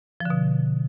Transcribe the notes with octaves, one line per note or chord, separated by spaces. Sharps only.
B2 D3 F3